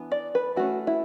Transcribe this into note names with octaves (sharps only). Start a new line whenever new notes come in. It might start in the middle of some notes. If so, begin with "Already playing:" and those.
Already playing: E3 B3 D4
D5
B4
E3 A3 C#4 F#4
E4